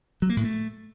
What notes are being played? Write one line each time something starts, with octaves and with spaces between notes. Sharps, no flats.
F#3
A#3
A2
A3